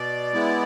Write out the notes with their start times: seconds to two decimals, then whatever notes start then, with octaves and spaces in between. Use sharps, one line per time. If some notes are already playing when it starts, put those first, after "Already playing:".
Already playing: B2 D5
0.34 G#3 B3 E4